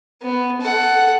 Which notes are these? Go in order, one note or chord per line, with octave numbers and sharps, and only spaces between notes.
B3
A4 F#5